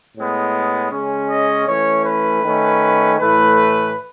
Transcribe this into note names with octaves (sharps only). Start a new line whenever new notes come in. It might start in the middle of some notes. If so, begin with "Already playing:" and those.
A2 G#3 B3
C#3 G#3 C#4
D#5
E3 A3 C#4 C#5
B4
D#3 A3 C#4
A2 E3 A3 B4